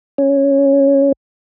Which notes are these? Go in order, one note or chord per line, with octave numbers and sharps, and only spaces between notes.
C#4